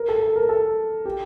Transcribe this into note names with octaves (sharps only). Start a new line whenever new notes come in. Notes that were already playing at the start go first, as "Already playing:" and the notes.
Already playing: A#4
A4
A4
A#4
A4
G4